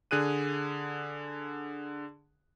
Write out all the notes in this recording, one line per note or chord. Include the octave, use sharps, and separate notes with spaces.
D3 G#4 F#6 D#7